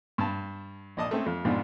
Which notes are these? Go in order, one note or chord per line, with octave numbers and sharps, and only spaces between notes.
G2 A5
A#1 D5 D#5 A5 D#6
A3 C4 C#4
F2
F2 G#2 B2 C4 D4 F4